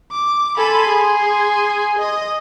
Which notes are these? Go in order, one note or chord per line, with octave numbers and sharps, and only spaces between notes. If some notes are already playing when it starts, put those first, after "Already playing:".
D6
A4 G#5 B5 C6
G#4
D#5